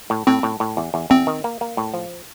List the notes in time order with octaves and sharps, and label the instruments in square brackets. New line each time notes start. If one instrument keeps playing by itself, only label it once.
[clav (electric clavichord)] A2
[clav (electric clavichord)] A2 [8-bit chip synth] C4
[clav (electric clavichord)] A2
A2
E2
E2
[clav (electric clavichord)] E2 [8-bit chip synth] C4
[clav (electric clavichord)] D#3
A#3
A#3
A2
F3